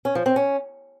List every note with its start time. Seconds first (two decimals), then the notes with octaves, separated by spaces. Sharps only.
0.05 C#4
0.15 F3
0.26 C4
0.36 C#4